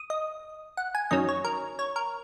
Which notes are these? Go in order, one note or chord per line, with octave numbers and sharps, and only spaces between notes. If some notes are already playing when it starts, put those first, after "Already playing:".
Already playing: D#6
D#5
F#5
G#5
F#2 D#3 F#3 C#4 D#5
C#5
A#4
C#5
A#4